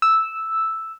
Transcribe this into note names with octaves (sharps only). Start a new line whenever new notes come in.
E6